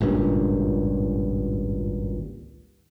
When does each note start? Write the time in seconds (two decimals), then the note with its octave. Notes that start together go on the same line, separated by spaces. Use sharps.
0.01 G#1 C#2 G2 A#2